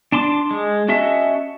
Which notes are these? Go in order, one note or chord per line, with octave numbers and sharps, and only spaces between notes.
D4 A5 C6 D6
G#3
C#4 F#4 D#5 E5 A5